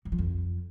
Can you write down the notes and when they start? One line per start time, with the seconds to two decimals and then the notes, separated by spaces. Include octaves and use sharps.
0.05 F#3
0.12 F3
0.18 F2